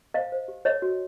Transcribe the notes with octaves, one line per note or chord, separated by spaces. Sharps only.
C5 D#5 F5
C5
G4
A4 C#5 D#5
F#4